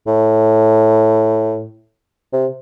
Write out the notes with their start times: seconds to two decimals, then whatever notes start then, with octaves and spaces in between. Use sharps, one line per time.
0.07 A2
2.33 C3